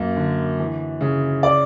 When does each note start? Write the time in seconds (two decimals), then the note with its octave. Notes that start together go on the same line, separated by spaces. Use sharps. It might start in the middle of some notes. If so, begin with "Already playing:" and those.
Already playing: F#2 A#3
0.16 D3
0.59 E3
1.01 C#3
1.43 D5